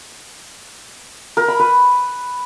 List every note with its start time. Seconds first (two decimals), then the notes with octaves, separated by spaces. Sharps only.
1.37 A#4
1.48 B5
1.59 B4